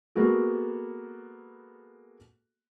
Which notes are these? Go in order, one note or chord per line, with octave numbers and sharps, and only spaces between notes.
G#3 A#3 B3 F#4 A4